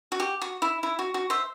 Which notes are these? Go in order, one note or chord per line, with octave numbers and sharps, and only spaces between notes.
F#4
G4
F#4
E4
E4
F#4
F#4
C5 E5